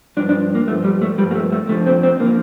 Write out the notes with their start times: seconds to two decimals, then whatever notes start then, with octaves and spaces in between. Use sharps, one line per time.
0.17 G2 F3 D4
0.29 D4
0.55 A#3
0.67 G2 A3
0.71 F3
0.84 G3
1.01 A3
1.18 G2 F3 G3
1.31 A#3
1.35 A3
1.52 A3
1.69 F2 D3 F3 A3
1.86 C4
2.03 C4
2.20 D3 F3 A#3